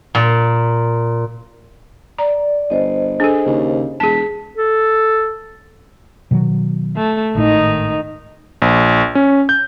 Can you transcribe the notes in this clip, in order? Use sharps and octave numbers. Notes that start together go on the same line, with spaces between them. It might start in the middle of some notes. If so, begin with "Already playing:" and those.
A#2
D5 A#5
G1 C5 D#5
D4 G#4 A4
D#2 C#3
E1 G#4 A5 B6
A4
B2 D#3 F#3
A3
G#1 A2 D#3 D#4
A#1
C#4
G6